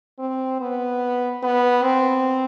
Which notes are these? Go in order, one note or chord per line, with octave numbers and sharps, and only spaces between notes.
C4
B3
B3
C4